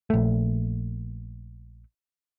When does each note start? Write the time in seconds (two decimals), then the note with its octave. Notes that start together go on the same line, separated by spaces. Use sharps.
0.10 A#1 A3